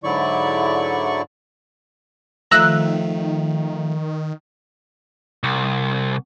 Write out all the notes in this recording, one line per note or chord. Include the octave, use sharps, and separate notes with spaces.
G#2 D3 F#3 E4 D5 C#6
D#3 F3 A3 A#5 E6 F#6
C2